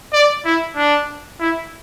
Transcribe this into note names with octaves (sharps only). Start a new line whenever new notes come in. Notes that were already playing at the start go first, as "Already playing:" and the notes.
D5
E4
D4
E4